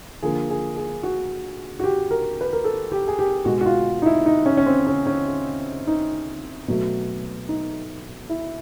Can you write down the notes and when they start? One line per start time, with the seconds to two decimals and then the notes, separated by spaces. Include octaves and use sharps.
0.23 D3 F3 A#3 G#4
0.50 G#4
0.77 G#4
1.03 F#4
1.80 F#4
1.84 G4
2.11 A#4
2.41 B4
2.53 A#4
2.64 A4
2.92 G4
3.08 G#4
3.19 G4
3.45 B2 G#3 F#4
3.61 F#4
3.66 F4
4.02 D#4
4.06 E4
4.26 D#4
4.46 C#4
4.57 C#4
4.66 C4
4.87 C#4
5.07 C#4
5.87 D#4
6.68 B2 F#3 A3
7.49 D#4
8.29 E4